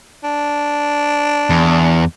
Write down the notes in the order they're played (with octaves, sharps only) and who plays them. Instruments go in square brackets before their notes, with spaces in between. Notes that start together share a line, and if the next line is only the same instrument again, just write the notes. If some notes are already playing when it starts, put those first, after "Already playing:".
[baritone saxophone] D4
[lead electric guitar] E2